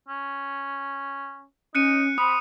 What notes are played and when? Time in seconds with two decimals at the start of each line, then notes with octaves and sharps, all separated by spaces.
0.08 C#4
1.75 C#4 D#4 F#6 C#7 D#7
2.18 C4 B5 D#6